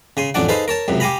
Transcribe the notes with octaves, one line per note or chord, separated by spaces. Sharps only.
C#3 G#5 C6
A1 F2 C#4 D4 D5 F#5
D#4 G#4 A4 B4 C5 F5
A#4 C#5 A5
C#2 F#2 C3
G4 F5 G#5 A#5 B5